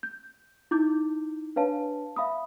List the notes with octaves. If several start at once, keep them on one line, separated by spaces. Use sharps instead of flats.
G6
D#4 E4 D6 G6
D4 B4 C#5 F5 A5
E5 F5 B5 D#6